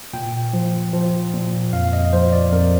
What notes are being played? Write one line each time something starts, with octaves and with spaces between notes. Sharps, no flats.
A#2 G5
F3
F3
A#2
F2 F5
D#5
F3 C5
D5
F2 A#4